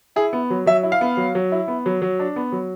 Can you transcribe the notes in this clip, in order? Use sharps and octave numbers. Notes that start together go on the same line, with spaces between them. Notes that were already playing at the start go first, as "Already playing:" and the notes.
E4 G#4
B3
F#3
F#3 E5
E4
F5
B3
F#3
F#3
E4
B3
F#3
F#3
D4
B3
F#3